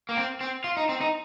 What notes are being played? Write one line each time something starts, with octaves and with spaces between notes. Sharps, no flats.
A#3
C4
C4
F4
D#4
C4
D#4